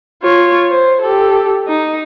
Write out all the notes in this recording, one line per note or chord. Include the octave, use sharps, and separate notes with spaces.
F4 C#5
C5
G4 A4
D#4